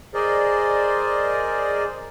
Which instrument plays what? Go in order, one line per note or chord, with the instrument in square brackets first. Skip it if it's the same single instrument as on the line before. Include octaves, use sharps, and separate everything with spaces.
[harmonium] G#4 A#4 C5 D5 D#5